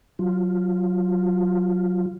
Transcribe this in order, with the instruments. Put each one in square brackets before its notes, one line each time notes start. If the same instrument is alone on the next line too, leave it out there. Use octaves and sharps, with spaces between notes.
[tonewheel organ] F#3 F4